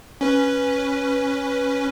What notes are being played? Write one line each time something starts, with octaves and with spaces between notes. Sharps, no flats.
C#4 B4